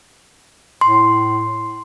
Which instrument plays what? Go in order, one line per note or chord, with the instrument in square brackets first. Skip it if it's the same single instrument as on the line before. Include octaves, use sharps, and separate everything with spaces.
[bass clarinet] A2 [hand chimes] C6